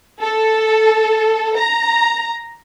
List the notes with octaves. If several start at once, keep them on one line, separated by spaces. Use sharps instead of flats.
A4
A#5